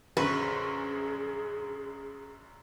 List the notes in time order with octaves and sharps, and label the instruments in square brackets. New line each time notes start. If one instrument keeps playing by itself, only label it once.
[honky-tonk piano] A#1 F#2 D3 [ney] G#4 [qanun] B4 [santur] E5 C6 C#6